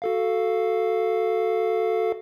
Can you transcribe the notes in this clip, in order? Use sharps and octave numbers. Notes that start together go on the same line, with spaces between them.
F#4 A4 F5